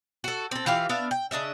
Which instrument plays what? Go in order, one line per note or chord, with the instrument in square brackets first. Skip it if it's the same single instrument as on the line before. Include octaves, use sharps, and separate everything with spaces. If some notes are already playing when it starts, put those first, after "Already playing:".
[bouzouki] F#4 A4
C4 A4
E3 F4 G4 F5
B3 D4 E5 F5
G5
C#3 D4 D#5 E5